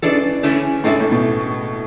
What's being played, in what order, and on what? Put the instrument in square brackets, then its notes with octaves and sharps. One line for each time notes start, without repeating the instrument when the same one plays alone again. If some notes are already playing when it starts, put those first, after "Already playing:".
[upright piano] C#3 E3 [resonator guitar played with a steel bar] G#3 D4 A4 D5
[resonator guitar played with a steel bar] D3 A3 C#4 E4 G#4
[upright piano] A2 C#3 [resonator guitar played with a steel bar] G#3 D4 A4 C#5 E5
[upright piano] A2
B2